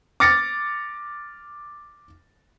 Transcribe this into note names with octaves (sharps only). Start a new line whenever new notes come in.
D6 F6 A6 A#6 C#7